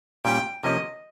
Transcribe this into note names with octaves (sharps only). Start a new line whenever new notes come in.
A#2 G3 C#4 G4 G5
C3 F3 A#3 C#4 G4 D#5